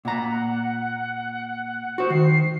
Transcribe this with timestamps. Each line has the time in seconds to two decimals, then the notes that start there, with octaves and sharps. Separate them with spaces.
0.05 A#2 F#5 A#5
1.98 F#4 C5 C#7
2.10 D#3 C7